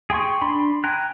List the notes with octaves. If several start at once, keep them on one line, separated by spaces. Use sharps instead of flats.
G#4 G5 C6 C#6
D4 B5 C6
G5 G#5 A#5 F#6